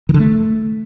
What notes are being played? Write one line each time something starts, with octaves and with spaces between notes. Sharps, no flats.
D#3
D3
A3